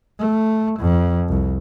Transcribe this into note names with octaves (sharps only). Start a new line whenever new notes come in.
A3
F2
C2